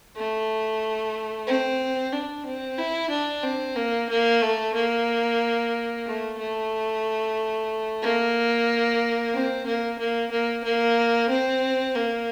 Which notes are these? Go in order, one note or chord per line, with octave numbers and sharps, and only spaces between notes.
A3
C4
D4
C4
E4
D4
C4
A#3
A#3
A3
A#3
A3
A3
A#3
C4
A#3
A#3
A#3
A#3
C4
A#3